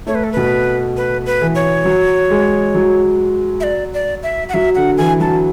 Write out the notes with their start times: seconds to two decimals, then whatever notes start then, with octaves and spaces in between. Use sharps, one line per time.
0.07 A3 C#5
0.15 B4
0.24 A4
0.32 B2 B4
0.97 B4
1.26 B4
1.41 E3
1.55 C#5
1.85 F#3
2.30 G#3
2.75 F#3
3.60 E5
3.63 D5
3.94 D5
4.23 E5
4.49 F#5
4.54 F#3 E5
4.75 D3 F#5
4.98 E3 G#5
5.20 F#3 A5